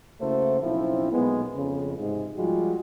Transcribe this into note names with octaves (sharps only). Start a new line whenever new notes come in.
C#3 A3 A#3 E4 F#4 C5
B1 F3 C4 C#4 D#4 E4
B1 A#2 G#3 B3
F2 C#3
G#2 C3 G#3
F3 G3 G#3 F4 F#4